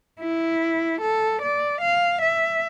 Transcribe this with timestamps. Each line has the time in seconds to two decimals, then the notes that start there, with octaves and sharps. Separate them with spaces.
0.20 E4
1.01 A4
1.41 D5
1.81 F5
2.21 E5